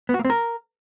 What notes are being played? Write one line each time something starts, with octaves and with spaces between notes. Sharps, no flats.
B3
F#4
A#3
C4
A#4